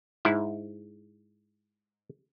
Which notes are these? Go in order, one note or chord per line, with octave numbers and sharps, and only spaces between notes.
G#2 E4